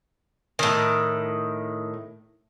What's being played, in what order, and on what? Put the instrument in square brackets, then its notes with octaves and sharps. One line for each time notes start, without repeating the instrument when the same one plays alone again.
[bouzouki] A2 D#3